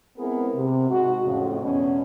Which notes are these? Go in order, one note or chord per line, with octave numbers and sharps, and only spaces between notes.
G#3 B3 C4 E4 G#4 A#4
C3
G#2 F#4
F2 A2 C#3
E2 B2 G#3 C#4